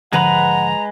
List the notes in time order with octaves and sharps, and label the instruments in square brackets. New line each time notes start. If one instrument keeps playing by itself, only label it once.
[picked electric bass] G#1 D3 F3 [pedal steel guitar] G#3 B4 B5 [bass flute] F#5 [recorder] A#5